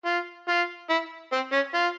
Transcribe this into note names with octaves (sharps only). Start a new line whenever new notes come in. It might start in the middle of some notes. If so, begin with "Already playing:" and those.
F4
F4
E4
C4
C#4
F4